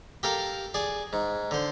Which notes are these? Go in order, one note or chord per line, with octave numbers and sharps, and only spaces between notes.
G4 A4 A#4 F5
G#4 D5
G#2
D3 C5